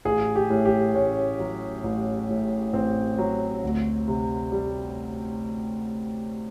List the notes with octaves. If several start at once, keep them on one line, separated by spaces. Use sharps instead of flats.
A1 G#4
G4
A2
G4
A1 C#4
F#3
A1
A2
A1 C4
F#3
D2
C3
G3